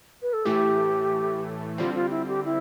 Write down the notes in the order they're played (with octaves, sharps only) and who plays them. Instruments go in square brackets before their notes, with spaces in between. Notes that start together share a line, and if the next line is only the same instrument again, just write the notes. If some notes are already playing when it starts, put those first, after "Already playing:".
[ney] B4
A4
[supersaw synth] A2 E3 A3 [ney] G4
[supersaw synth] D3 G3 C4 [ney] F4
[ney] F4
E4
G4
E4